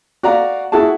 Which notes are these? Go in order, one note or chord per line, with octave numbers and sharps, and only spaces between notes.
F#4 D5 F5 A#5
E4 F#4 G#4 A5